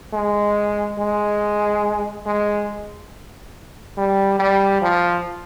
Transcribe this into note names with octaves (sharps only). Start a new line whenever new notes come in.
G#3
G#3
G#3
G3
G3
F3